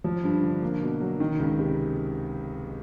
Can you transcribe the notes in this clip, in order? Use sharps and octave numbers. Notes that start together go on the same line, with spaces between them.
F3
G2
D3
A#3
B2
F#3
D#3
C#2
C3